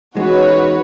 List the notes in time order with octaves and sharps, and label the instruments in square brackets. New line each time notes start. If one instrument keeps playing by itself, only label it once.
[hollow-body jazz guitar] E2 G#3 [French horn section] C#4 D#4 [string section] F#4 B4 C#5